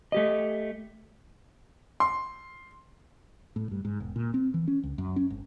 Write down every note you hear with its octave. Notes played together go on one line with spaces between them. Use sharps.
A3 G4 D#5
C6
A2
G2
G#2
E1
A#2
C4
E3
C#4
C#2
F#2
C#4
G#1